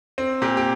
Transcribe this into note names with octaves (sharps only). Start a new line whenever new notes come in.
C4
A#2 G4
G4